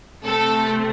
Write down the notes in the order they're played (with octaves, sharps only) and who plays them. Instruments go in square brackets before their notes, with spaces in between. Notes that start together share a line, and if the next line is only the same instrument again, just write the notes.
[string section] C3 A3 C4 A4